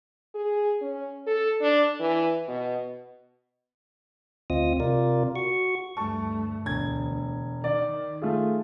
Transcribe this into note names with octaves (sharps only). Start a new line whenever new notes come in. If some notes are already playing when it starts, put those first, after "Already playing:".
G#4
C#4
A4
D4
E3
B2
D2 C4 F4 D#5 D#6
C3 F4 A#4 D5
F#4 C#6
D2 G2 A3 A5 C#6
E1 D2 G#6
D#3 D5
A3 F4 G#4